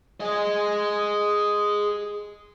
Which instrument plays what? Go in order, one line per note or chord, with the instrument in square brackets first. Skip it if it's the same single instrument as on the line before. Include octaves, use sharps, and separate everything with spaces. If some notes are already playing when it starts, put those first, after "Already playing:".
[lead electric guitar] G#4 D#5